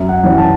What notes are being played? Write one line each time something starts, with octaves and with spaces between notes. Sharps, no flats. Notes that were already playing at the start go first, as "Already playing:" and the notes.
Already playing: F#2 E5
F#5
E3 G3 C#4
A5